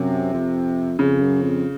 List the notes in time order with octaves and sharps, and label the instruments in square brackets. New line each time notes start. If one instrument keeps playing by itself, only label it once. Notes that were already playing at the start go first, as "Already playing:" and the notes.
Already playing: [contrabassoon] F#2 [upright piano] C3
[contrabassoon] F2
[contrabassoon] F2 [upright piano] C#3
[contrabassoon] F#2
F2